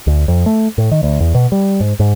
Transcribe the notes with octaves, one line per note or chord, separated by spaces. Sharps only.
D2
F2
A3
A2
D#3
D2
E2
B2
G3
G#2
G#2